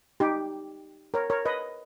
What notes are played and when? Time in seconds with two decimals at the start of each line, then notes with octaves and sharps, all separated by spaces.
0.20 D#4 G4
1.14 A#4 C#5
1.30 A#4 C#5
1.45 B4 D#5